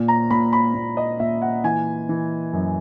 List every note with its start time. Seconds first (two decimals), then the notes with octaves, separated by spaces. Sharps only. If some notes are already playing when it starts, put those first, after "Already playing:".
Already playing: A#2
0.08 A#5
0.30 A#2 B5
0.53 B5
0.74 A#2
0.97 D#5
1.20 A#2 E5
1.42 F#5
1.64 E3 G#5
2.09 E3
2.53 F#2